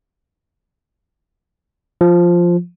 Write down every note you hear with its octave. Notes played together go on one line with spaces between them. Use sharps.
F3